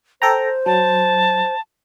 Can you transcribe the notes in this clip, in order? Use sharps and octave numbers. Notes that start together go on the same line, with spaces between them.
A4 C5 G5 A#5
F#3 A5